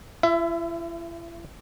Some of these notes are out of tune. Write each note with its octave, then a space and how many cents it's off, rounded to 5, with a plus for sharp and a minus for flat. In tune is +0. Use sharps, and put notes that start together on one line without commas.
E4 +40 E5 +15